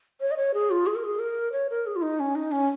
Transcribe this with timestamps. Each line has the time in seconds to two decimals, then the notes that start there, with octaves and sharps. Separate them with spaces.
0.21 C#5
0.31 D#5
0.37 C#5
0.54 G#4
0.71 F4
0.87 G#4
0.95 A#4
1.04 G#4
1.19 A#4
1.52 C#5
1.70 A#4
1.87 G#4
1.96 F4
2.02 D#4
2.20 C#4
2.36 D#4
2.52 C#4